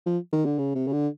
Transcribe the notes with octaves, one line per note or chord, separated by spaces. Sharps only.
F3
D#3
D3
C#3
C3
C#3
D3